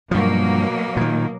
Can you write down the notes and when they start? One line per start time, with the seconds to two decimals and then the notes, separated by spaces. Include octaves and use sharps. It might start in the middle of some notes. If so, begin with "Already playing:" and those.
0.11 G2 B2 F3 F#3 A#3
0.97 A#2 D#3